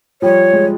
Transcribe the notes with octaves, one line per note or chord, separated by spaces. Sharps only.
F3 G3 C#5
G#3